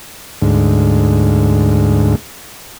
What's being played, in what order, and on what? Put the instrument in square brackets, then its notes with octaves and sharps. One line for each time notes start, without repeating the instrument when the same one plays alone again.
[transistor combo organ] D2 G#2